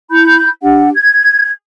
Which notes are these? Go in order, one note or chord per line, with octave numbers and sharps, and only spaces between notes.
E4 B5 G6
D4 G4 F#5
G#6